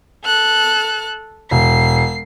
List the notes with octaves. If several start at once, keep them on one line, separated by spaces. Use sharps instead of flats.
A4 F#6
E1 C7